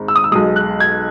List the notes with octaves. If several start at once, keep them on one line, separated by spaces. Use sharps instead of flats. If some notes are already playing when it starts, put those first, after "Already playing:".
Already playing: G#1 G#2
E6
D#6
E6
B1 B2 G#3 D#6
F#6
G#6